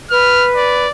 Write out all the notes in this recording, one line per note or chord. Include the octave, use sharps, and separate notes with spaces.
B4 F6
D5